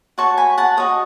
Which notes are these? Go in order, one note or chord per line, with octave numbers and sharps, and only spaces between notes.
F#4 C#5 A5 C#6
G#5 B5
F#5 A5
F#4 C#5 D#5